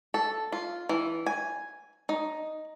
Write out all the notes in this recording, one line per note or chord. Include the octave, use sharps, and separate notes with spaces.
A4
F4
E3
G#5
D#4